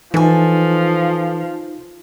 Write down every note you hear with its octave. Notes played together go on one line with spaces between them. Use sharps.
E3 F3 D#4 A4 G#5